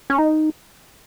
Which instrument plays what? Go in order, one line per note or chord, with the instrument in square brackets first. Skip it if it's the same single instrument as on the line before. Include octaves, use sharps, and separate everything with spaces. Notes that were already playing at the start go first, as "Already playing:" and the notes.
[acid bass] C#4
D#4